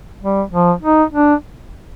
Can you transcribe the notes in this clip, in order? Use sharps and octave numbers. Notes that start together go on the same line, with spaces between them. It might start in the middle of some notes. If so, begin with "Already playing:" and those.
G3
F3
D#4
D4